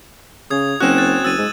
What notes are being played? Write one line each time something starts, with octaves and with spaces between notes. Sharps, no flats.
C#3 D#6 G#6
F#1 C4 C#4 F#4 F#6 E7
F#6 A6
F#1 E6 A6 D#7
G#2